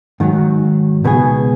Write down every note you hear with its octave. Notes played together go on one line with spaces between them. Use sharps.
G#2 D#3 F#3
C#2 B2 B3 G#4